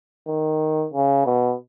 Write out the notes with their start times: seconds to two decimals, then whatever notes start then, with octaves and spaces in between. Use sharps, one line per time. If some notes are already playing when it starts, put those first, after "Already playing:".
0.27 D#3
0.93 C#3
1.26 B2